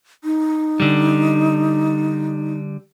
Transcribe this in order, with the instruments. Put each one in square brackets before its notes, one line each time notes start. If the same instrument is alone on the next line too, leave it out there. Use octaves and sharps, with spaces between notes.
[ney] D#4
[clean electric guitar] D3 G3